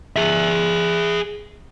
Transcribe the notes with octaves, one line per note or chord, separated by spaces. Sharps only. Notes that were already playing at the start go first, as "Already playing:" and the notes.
G#4 E5